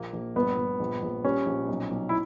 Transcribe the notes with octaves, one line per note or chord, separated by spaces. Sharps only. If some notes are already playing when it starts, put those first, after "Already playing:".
Already playing: A#1 A#3
A#1
G1 B3
G1
A#1
A#1
G3 C#4
A#1
B1
B1
E4